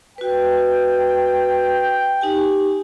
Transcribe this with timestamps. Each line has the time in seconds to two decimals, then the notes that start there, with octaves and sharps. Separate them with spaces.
0.18 F#4 B4 G5
2.21 D#4 G4 G#5